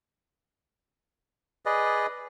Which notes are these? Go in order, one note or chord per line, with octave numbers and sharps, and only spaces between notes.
G#4 B4 D5 D#5